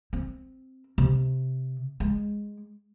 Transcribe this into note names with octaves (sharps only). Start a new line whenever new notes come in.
C4
C3
G#3